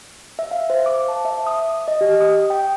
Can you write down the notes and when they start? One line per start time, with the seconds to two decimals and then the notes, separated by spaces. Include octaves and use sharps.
0.39 E5
0.51 F5
0.70 C5
0.86 D6
1.08 A5
1.25 E5
1.47 D#6
1.88 D#5
2.01 G4
2.21 D#6
2.50 G5